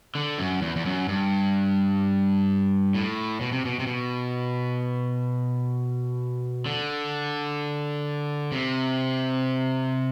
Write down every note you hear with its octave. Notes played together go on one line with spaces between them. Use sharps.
D3
F#2
E2
E2
F#2
G2
A2
B2
C3
B2
C3
B2
D3
C3